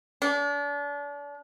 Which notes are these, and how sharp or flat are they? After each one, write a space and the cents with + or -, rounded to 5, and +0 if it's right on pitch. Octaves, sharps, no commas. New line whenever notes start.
D4 -35